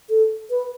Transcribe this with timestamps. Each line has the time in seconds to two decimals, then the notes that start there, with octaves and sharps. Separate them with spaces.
0.10 A4
0.50 B4